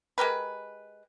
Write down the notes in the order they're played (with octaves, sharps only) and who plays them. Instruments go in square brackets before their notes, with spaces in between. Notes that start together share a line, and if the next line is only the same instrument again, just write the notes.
[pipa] G#3 G4 A#4 B4